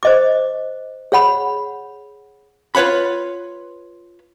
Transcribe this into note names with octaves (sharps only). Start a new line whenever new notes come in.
C5 D#5 D6
G#4 C#5 F#5 B5
F4 B4 C#5 F#5 B5